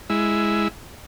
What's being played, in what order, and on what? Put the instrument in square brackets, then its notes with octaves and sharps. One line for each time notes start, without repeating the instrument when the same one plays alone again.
[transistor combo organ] G#3 E4